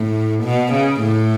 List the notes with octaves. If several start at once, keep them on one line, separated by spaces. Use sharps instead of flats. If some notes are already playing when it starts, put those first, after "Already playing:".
Already playing: A2
B2
C#3
A2